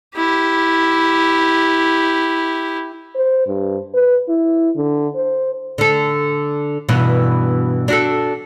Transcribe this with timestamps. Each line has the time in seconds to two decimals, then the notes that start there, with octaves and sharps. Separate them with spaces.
0.17 E4 G4
3.15 C5
3.47 G2
3.94 B4
4.28 E4
4.76 D3
5.15 C5
5.78 D3 A4
6.88 G2 B2 E3
7.88 D4 F#4 A4